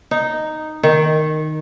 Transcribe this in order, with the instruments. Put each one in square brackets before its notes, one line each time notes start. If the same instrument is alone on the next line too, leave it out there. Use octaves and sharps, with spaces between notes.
[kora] D#4
D#3